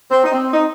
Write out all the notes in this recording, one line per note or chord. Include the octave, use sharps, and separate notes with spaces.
C4
D#4
C4
D#4